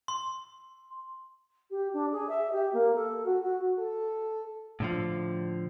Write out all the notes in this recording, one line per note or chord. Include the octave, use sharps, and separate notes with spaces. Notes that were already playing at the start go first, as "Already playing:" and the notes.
C6
G4
D4
G#4
E5
G4
A#3
A4
F#4
F#4
A4
A2 D3 F3